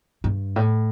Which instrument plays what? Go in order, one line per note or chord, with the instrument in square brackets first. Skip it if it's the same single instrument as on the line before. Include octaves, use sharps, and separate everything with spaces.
[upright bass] G2
A2